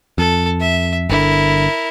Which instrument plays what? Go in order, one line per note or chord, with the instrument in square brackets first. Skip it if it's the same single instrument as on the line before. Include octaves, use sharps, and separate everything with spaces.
[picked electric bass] F2 [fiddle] A4
[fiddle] E5
[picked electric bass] G1 D3 [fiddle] E4 A#4